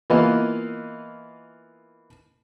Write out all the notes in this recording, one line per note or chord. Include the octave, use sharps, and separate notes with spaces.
E3 A#3 B3 F4 D#5